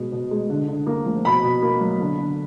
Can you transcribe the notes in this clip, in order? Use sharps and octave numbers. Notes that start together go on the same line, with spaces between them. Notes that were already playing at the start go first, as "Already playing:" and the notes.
Already playing: B2 G#3
B2
G#3
D3
D3
A#3
F3
B2 B5
B2
A#3
F#3
D3
D3